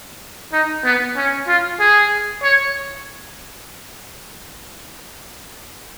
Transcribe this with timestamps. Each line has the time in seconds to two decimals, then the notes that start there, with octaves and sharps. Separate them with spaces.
0.53 D#4
0.85 B3
1.17 C#4
1.47 F4
1.80 G#4
2.43 C#5